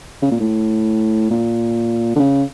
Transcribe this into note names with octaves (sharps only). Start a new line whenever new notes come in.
C#3
A#2
A2
A#2
D3
C#3